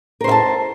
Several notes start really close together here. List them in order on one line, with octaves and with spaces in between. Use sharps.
A#4 C5 E5 A5